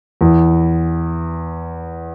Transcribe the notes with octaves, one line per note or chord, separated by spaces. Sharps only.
E2 E3